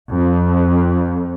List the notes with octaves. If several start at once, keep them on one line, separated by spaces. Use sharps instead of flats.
F2